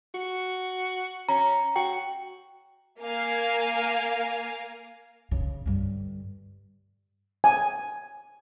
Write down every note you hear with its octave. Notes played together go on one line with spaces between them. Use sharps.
F#4
C#4 A#5
F#4 G5
A#3 A#4 F5 G#5
C#3
G2 D3
G#5